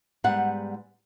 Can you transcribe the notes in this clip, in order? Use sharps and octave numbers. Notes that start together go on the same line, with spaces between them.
G#2 G3 B3 F#5